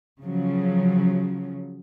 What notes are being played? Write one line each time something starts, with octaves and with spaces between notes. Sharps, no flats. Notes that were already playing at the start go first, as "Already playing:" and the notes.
C#3 F3 F#3